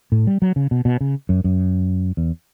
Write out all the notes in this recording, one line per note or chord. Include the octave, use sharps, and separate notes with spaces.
A2
G3
F#3
C#3
B2
B2
C#3
F#2
F#2
E2